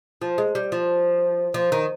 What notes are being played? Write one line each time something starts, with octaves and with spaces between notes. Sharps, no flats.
F3
G#3
G3
F3
F3
D#3